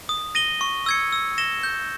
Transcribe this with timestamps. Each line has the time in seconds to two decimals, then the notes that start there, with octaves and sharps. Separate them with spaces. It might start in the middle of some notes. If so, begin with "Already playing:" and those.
0.09 D#6
0.35 A#6 D#7 G7
0.61 C#6
0.86 E6 G#6 C#7
1.12 E6
1.38 A#6 E7 G7
1.63 G6